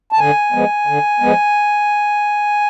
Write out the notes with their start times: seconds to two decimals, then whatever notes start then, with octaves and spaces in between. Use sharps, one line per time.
0.12 A5
0.19 D3 G#5
0.52 F3 G#3 B3
0.87 D3
1.20 F3 G#3 B3